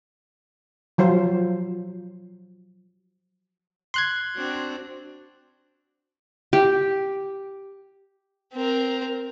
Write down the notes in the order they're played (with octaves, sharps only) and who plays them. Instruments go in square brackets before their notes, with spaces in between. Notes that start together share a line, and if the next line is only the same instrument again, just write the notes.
[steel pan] F3 F#3 F4 C5
[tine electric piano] C6 F#6 G#6
[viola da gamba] C4 D4 F#4
[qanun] G4
[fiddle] C4 A#4